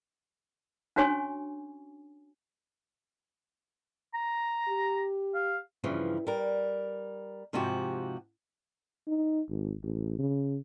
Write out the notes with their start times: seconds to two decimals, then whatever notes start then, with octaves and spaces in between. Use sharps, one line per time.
0.96 C#4 D4 F#4 C#5 G#5 C#6
4.14 A#5
4.69 G4
5.35 F5
5.84 G2 C#3 E3 F3
6.27 G3 A#4
7.53 G#2 C3 F3 F#4 G4
9.08 D#4
9.49 G#1
9.83 A1
10.18 C#3